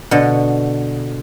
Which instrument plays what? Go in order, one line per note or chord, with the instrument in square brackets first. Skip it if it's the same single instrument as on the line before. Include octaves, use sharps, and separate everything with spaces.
[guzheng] B2 D3